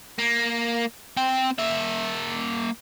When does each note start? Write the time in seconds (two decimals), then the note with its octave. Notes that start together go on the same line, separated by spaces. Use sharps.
0.19 A#3
1.17 C4 G5
1.59 A#3 E5